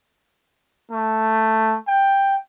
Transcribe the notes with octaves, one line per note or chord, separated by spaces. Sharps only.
A3
G5